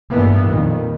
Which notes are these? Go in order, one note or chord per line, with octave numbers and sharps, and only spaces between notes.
A1 G2 E3 G3 A#3 B3
F2 A#2 D#3